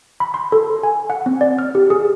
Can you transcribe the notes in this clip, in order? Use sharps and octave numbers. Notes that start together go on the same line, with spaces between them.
B5
C6
A4
G#5
F#5
C4
D5
F6
G4
G#4